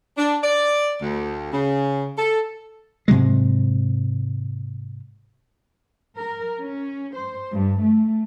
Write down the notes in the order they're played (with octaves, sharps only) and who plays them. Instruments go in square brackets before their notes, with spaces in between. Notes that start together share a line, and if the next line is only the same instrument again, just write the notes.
[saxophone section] D4
D5
D2
C#3
A4
[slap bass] G#2 C3 F#3 G#3
[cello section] A#4
C#4
C5
G2
A3